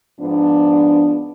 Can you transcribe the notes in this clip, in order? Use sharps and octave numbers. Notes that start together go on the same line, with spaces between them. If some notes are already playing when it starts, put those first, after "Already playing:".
G#2 F3 B3 D4